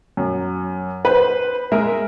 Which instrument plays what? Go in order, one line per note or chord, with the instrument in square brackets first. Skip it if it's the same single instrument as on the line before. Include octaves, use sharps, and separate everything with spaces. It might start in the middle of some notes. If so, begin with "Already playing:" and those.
[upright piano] F#2
B4 C5
G#3 A#4 E5